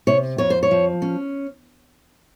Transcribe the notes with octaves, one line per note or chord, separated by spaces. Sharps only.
C3 C#5
F2 C#5
C5
C#5
F3
C#4